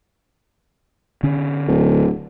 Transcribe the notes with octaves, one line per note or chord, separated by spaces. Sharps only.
D3 C#4
D1